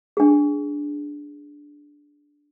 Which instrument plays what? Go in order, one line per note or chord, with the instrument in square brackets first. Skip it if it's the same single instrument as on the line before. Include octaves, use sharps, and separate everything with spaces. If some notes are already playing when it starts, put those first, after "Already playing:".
[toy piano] D4 G#4